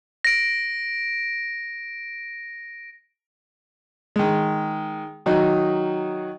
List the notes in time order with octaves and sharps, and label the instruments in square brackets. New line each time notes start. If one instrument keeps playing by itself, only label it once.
[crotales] A#6 D7
[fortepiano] D#3 G#3
D#3 F#3 D#4